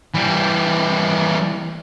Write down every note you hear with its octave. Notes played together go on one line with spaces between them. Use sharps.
E3 G3